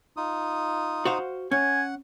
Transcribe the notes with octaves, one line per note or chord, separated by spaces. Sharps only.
D#4 F4 D#6
F#4 C5 F5
C#4 F#5 G#5